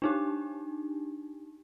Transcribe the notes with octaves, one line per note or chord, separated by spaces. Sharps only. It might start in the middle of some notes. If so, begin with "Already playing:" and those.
D4 D#4 G4